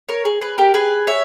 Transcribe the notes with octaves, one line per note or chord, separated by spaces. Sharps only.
A#4 C#5
G#4
G#4 B4
G4 A#4
G#4 B4
C#5 E5